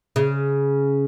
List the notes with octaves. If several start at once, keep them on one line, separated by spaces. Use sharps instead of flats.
C#3